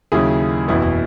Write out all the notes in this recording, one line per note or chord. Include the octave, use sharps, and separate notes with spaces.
D#2 C#3 F#3 E4 G#4
F#1 E2 B2 E4
E4